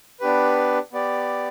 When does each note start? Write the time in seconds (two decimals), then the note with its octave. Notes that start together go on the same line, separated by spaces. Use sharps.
0.20 B3 D4 G4 B4
0.93 B3 G4 D5